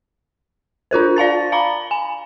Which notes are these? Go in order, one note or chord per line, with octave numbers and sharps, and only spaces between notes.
D4 F4 A#4 C5
D5 F5 A5 A6
F5 A#5 B5
G#5